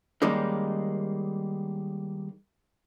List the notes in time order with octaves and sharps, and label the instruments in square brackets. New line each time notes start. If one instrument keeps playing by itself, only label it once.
[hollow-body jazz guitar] D#3 G3 G#3 A#3 C#4 D#4